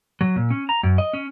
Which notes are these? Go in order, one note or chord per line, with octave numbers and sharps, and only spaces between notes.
F#3
A#2
C#4
A#5
F#2
D#5
C#4